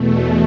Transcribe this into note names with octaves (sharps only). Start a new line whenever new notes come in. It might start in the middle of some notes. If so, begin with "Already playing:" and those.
Already playing: E2 B2 A3